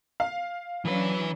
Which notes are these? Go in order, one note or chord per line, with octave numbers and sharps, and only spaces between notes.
F5
E3 F#3 C#4 D4 B4